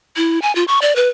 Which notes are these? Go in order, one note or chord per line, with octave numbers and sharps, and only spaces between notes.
E4
G#5
F4
C#6
D5
B4